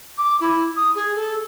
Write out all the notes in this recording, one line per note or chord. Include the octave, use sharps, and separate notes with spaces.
D6
E4
D#6
G#4
A4